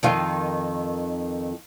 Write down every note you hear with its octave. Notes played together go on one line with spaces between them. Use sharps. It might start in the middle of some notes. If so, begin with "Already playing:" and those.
F2 D#3 F4